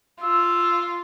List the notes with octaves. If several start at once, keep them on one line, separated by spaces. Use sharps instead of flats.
F4 E6